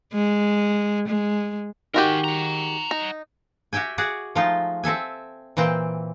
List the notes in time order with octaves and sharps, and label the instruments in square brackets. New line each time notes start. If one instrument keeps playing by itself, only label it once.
[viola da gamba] G#3
G#3
[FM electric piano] D#3 [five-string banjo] G#3 F#4 G4 [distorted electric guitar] A#4 G#5
[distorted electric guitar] F#5 A#5
[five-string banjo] D#4
[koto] F#4 G4 E5 G5 G#5
F#4 G#4 D5 F#5
F3 G#3 A3 D#4 F4
C4 A4 E5 G#5
A#2 E3 C4 G5